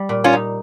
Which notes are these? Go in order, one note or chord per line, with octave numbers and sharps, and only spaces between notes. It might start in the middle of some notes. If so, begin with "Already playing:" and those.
Already playing: G3
A#2
C#4 F4
D#4